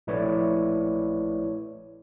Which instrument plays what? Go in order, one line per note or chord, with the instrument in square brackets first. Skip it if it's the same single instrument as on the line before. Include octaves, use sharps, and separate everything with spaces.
[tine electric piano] A#1 A3 E4 B4 C#5 D5